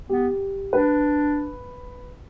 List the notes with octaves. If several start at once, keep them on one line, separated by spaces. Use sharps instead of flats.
B3 G4
D4 B4